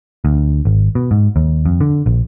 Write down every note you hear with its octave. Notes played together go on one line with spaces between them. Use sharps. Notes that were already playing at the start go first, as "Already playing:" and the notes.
D2
G#1
B2
G#2
D#2
F2
D3
A#1